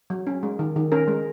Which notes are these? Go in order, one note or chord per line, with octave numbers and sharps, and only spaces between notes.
F#3
C#4
G#3
D#3
D#3
C#4 A#4
G#3